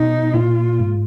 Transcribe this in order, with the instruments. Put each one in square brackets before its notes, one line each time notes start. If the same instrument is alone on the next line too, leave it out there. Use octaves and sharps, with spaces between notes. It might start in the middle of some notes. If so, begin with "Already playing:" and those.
Already playing: [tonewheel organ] B2 [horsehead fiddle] D#4
[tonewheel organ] A#2 [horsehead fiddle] F4
[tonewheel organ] G#2